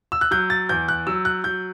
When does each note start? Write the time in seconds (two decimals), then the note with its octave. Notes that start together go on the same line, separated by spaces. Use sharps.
0.12 E6
0.21 F#6
0.31 F#3 G6
0.50 A6
0.69 E2 G6
0.88 F#6
1.07 F#3 E6
1.25 F#6
1.44 F#3 G6